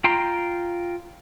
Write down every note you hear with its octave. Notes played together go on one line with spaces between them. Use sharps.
F4 G5 A#5 C6